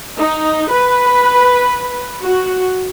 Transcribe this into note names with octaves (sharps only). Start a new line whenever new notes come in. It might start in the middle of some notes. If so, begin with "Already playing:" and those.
D#4
B4
F#4